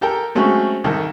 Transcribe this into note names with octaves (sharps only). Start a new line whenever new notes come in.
G4 A4 A#4 G5
F#3 G#3 A3 C4 C#4 F#4
C2 D#3 A4